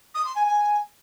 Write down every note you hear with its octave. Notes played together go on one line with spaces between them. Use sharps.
D#6
C6
G#5
G#5